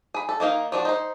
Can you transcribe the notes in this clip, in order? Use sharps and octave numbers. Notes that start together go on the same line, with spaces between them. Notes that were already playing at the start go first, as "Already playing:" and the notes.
G#4 B5
A4
D#3 A#3 D#4 F5
F3 D4 F#4
D#4 C5